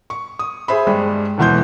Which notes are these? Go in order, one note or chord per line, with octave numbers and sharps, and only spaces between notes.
C#6
D#6
G#4 C5 E5 B5
G2 G3 G#3
E1 D2 B2 E3 C6 G6